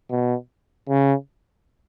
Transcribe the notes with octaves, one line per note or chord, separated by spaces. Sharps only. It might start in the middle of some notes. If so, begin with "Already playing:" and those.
B2
C#3